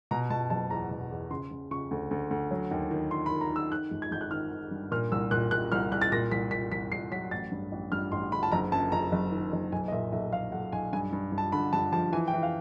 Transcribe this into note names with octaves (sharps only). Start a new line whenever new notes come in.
B2 A#5
B2 A5
F#1 A5
E2 A#5
B2
E2
C#3 C6
C#3
C#3 C#6
D2
D2
D2
F#3
D#2
D#3
D#3 C6
B5
D#3
A#5
D#3 E6
D#3 F#6
G#1
G#6
G#1 G6
F#6
D#3 F6
D#3
G2
A#2 F6
C2 E6
A#2 F#6
A#2 F#6
C2 F6
C2 F#6
A6
A#2 A#6
C2 B6
A#2 B6
C2 B6
C2 C7
F#3 B6
A1 A6
G2
A1
G2 F6
A1 C6
D3 B5
A5
F#1 A#5
F#2 A5
F#1 A#5
F#1
D#3
F#1
B1 G#5
D#5
A#2 E5
B1 E5
B1 F5
B1 F#5
B1 G#5
G2 G#5
G2
G2
A5
D3 B5
G2 A5
F3 A5
E3 G#5
G5
E3
F5